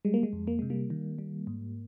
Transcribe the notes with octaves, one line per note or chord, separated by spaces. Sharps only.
G3 G#3
A#3
G#3
F2
A#3
C3 G#3
G3 A#3
D#3
G3
G#2